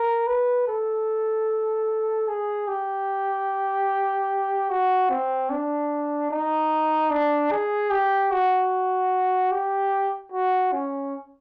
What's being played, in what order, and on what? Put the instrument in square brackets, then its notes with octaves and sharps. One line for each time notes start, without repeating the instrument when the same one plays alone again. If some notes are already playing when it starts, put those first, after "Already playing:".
Already playing: [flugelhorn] A#4
B4
A4
G#4
G4
F#4
C4
D4
D#4
D4
G#4
G4
F#4
G4
F#4
C#4